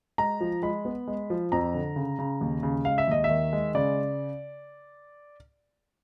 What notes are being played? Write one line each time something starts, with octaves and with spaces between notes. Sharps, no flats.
G#3 A#5
F3
G#3 B5
B3
G#3
F3
F2 A#5
D3
C#3
C#3
D#2
C#3
G#3 F5
E5
D#2 D#5
E5
D#3
G#3
C#3 D5